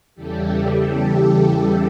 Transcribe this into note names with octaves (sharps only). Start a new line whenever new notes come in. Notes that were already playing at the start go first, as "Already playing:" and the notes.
E2 C#3 E3 G3 G4 A4
G4 A4